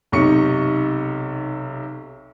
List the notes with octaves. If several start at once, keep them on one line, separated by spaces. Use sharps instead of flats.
B1 C3 D#4 C#6 C#7